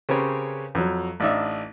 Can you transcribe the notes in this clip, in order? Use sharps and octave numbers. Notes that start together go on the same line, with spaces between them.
C#3 C4 G4 A#4 B4 C#5
F2 F#3
A1 D4 D#4 E5